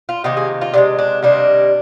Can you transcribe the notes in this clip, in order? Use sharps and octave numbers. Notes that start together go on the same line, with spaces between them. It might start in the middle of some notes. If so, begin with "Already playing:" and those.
F4
C3 D#3 A#3 G4
G#4
F4
C3 D#3 G#3 D4
D4
C3 D#3 G3 A#3 D4